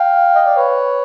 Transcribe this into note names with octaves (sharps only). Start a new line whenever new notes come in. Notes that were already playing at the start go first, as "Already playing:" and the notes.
Already playing: F5 G5
D#5
D5
B4 C#5